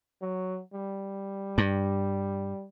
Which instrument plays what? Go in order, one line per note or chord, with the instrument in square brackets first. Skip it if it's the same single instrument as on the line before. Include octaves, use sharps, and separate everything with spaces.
[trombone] F#3
G3
[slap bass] G2